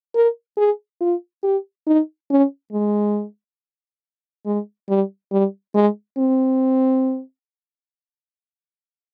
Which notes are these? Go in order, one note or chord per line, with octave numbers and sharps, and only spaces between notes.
A#4
G#4
F4
G4
D#4
C#4
G#3
G#3
G3
G3
G#3
C4